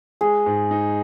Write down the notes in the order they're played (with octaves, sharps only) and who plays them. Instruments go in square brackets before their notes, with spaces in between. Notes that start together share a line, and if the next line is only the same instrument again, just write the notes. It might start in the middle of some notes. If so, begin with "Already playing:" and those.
[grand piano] G#3 [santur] G#4
[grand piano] G#2
D#4